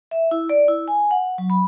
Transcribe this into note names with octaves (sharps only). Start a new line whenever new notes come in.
E5
E4
D5
E4
G#5
F#5
F#3
B5